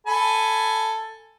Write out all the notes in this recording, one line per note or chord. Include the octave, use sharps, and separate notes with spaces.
A4 G#5 B5